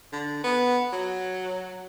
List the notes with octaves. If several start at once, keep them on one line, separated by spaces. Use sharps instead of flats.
D3
B3
F#3